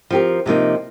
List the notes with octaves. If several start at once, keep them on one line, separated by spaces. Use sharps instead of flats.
F3 C4 G4 A#4
C3 F3 A#3 D#4